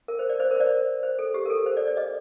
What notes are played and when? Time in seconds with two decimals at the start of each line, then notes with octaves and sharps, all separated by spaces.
0.08 A#4
0.19 C5
0.29 D5
0.40 C5
0.51 A#4
0.56 C5
0.60 D5
1.03 C5
1.19 A4
1.34 G4
1.46 A#4
1.50 A4
1.66 C5
1.77 D5
1.87 D5
1.97 D#5